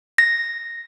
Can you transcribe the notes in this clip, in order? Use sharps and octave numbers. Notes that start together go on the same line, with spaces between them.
A#6